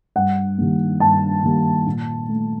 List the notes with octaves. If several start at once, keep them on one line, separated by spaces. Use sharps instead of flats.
G2 F#5
D#3 G3 A#3
G2 A5
D#3 G3 A#3
A#2
A3